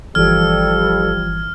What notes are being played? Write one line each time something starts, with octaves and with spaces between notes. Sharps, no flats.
G1 E3 F3 G3 A4 F6 G#6